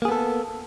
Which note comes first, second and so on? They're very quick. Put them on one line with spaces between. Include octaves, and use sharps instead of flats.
A#3 G#4 B3 A4